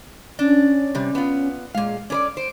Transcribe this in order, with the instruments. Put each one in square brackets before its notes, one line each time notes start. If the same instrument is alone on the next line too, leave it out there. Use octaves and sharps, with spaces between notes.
[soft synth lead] C#4 [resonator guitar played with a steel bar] D4
[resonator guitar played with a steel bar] C3 G3
B3 F4
[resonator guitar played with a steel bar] A#2 F5 [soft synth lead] G#3
[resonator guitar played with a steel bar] C#4 B4 D5 [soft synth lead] D6
[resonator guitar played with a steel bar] C5 [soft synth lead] D7